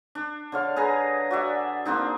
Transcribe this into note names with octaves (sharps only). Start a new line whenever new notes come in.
D4
D3 C#5 F5
G#4 B4 G#5 A#5
F#4 D5 E5
A#3 C4 D4 D#4